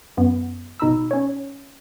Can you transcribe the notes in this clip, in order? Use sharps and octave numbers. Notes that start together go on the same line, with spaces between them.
F#2 B3
G#1 B2 D#4 A#5 B5 E6
C#4 C#5